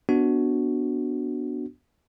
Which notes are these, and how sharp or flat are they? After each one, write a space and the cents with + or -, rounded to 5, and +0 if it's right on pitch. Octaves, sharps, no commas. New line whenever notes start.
B3 +0 D4 +0 F#4 +0